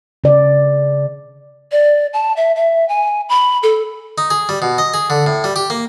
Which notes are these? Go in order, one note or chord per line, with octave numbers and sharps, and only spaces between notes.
C#3 D5
D5
A5
E5
E5
G#5
B5
A4
D#4
G#4
G3
B2
D#5
G#4
D3
A2
G3
G4
A#3